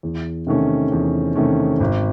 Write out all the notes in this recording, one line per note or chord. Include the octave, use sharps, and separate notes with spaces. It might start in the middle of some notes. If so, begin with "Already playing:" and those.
E2
C3 D#3 A3 C#4
E2
C3 D#3 A3 C#4
G#1